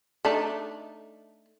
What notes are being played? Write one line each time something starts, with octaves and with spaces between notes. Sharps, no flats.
A3 D4 D#4